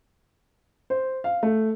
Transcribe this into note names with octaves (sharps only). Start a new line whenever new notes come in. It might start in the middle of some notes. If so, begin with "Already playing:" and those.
C5
F5
A3